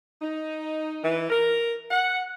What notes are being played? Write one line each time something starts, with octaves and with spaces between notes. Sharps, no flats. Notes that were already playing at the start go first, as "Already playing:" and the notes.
D#4
E3
A#4
F#5